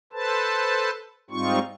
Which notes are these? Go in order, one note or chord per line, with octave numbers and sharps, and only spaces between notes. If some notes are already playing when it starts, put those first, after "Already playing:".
A4 B4 C5 A5
G#2 G3 C4 D#4 F4 C#6